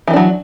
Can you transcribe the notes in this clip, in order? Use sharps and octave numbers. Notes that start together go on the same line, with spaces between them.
D#3 E3 F#3 D4